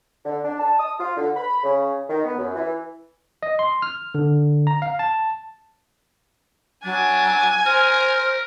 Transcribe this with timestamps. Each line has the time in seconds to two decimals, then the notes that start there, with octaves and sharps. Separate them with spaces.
0.25 D3
0.44 D4
0.59 A5
0.79 D#6
0.99 F4
1.16 D3
1.36 B5
1.63 C#3
2.09 D#3
2.24 B3
2.38 F#2
2.55 E3
3.43 D#5
3.59 C6
3.82 F6
4.15 D3
4.67 A#5
4.82 F5
4.99 A5
6.84 F#3 D4 G#5
7.66 A#4 C5 F6